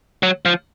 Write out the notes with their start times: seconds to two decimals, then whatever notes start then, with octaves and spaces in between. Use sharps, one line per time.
0.23 F#3
0.45 F3